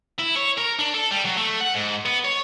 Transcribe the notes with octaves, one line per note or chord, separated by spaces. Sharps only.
E4
C#5
A#4
D4
A4
G3
F#3
A3
F#5
G#2
B3
C#5